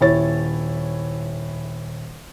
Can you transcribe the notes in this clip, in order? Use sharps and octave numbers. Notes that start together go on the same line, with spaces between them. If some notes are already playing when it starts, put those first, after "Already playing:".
D#1 E4 C#5 A6